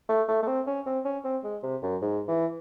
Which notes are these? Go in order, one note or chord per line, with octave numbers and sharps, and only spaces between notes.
A3
A3
A3
C4
C#4
C4
C#4
C4
G#3
C3
F#2
G#2
E3